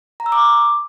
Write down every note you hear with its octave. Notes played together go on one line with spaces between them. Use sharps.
A#5
E6
D6